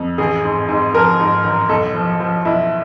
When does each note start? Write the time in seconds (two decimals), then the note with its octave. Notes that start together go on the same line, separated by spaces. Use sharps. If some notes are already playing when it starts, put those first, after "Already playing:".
Already playing: F2
0.18 A1 G#4
0.44 G#2
0.68 G#2
0.94 F3 A#4
1.20 G#2
1.44 A1
1.69 B1 A4
1.95 F3
2.20 F3
2.45 B1 E4